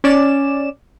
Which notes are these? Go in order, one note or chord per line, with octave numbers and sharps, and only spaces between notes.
C#4 D5 E7